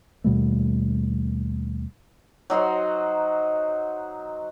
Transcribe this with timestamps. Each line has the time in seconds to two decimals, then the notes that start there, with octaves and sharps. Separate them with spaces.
0.24 D#2 B2 G3 A3
2.50 F#3 D#4 F#4 C5